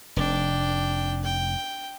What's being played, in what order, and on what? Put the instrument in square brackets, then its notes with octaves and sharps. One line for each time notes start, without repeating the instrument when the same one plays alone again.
[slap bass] F1 [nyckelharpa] D4 G5
[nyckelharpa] G5